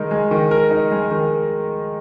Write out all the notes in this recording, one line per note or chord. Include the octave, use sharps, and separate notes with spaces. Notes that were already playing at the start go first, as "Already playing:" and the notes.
Already playing: D#3 G#3 D#4 A#4
G#3
D#3
A#4
D#4
G#3
D#3